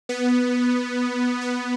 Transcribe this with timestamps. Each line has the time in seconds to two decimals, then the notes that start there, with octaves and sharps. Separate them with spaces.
0.09 B3
1.41 B3